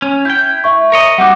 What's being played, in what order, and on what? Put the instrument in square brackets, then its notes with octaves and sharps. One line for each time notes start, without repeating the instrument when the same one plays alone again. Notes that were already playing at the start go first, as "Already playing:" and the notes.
[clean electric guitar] C#4
[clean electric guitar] E4 G5 [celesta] G6
[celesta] E5 C#6
[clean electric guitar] A#4 C#5 D#5
[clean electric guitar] G3 C4 F#4 [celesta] F#5 D6